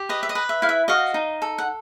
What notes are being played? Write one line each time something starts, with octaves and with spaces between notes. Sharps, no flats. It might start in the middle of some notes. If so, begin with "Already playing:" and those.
Already playing: G4
B4 D#5
E5
D#5
B4
E5
E4 F5
E5
F#4 D#5 F5
D#4
A4
F#5